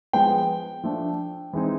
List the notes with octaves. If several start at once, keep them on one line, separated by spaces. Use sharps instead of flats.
F3 G#3 B3 G5
F3 A3 D4
E3 G#3 C4 D#4